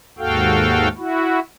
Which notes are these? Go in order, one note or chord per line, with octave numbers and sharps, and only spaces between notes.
D#2 G#2 F#4 A4 F5 G5
E4 F#4